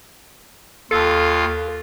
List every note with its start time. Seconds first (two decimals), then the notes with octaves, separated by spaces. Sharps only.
0.91 D#2 F4 A4 F5